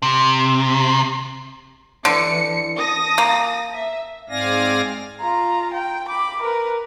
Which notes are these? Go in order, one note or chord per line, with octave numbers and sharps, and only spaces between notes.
C3
D3 E3 C#7
A5 D#6 A#6
A#3
E5
G#2 C4 D5 F5 G#5 A#6
F4 A#5
G5
B5 D6
A#4 B4